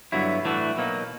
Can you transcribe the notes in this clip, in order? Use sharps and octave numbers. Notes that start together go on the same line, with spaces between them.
G2 D3 F#3 B3 E4
A2 E3 A3 D4 F#4
B2 F#3 A#3 D#4